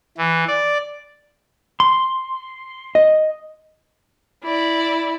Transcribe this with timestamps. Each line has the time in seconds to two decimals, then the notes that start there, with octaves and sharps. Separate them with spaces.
0.18 E3
0.48 D5
1.80 C6
2.95 D#5
4.44 E4 D5